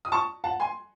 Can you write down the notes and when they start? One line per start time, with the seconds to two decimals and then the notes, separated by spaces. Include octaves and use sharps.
0.05 D#6
0.12 A5 C#6
0.44 F#5 A5
0.60 G#5 C6